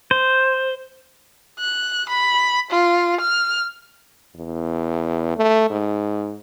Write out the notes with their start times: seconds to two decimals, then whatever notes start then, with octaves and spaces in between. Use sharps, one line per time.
0.11 C5
1.59 F#6
2.09 B5
2.71 F4
3.20 F6
4.36 E2
5.37 A3
5.70 G#2